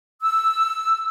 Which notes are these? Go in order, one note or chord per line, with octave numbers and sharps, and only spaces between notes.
E6